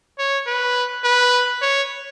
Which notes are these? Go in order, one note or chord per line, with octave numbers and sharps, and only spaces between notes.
C#5
B4
B4
C#5